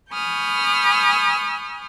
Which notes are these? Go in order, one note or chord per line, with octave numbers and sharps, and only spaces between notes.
G#5 B5 C#6 D#6 F6 G6